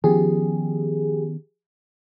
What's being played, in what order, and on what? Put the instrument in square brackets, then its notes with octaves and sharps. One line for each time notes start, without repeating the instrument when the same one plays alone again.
[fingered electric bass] D#3 B3 C#4 [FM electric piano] F3 G4 G#4